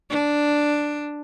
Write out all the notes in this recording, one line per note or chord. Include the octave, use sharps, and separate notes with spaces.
D4